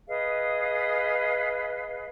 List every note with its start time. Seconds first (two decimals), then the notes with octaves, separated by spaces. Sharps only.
0.08 G#4 B4 D#5 F5